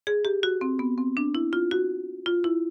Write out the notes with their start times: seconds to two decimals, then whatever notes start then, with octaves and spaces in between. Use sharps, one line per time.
0.07 G#4
0.25 G4
0.43 F#4
0.61 C4
0.79 B3
0.98 C4
1.17 D4
1.35 E4
1.53 F4
1.71 F#4
2.26 F4
2.44 E4